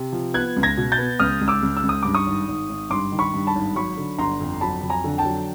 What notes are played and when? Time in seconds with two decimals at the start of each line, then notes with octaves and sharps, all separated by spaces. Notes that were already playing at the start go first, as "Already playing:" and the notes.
Already playing: C3
0.13 F3
0.34 B3 F#6 G#6
0.56 C#2
0.63 G#6 A#6
0.77 B2
0.92 G6 A6
0.98 B3
1.19 C#2 D#6 F6
1.41 C#2
1.48 D6 E6
1.63 C#2
1.77 E6
1.83 C#2
1.89 D#6
2.03 G2 D6
2.15 C#6 D#6
2.26 G#1
2.48 G#1
2.69 G#1
2.90 G2 C6 D6
3.12 D#3
3.19 B5 C#6
3.34 G2
3.47 A5 B5
3.55 G#1
3.75 F#3 B5 C#6
3.97 D3
4.18 G1 A#5 C6
4.41 F2
4.61 F#3 A5 B5
4.83 F2
4.90 G#5 A#5
5.04 D3
5.18 G5 A5
5.25 F#3